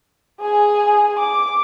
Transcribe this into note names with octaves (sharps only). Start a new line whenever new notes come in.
G#4 G#5
D6